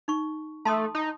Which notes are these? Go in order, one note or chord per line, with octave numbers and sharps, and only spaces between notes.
D#4 C#6
A3 A5 C6 D#6
D#4